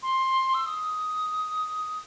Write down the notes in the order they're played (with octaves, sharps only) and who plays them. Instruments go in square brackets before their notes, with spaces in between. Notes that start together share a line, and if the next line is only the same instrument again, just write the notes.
[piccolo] C6
E6
D#6